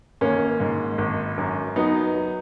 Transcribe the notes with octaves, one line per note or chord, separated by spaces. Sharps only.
G#1 A#3 C#4
G#2
G#1
F#2
F#3 B3 D#4
F#3